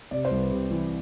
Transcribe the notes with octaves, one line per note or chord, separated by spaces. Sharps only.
C3 D5
C5
C2
B4
C3 G4
E3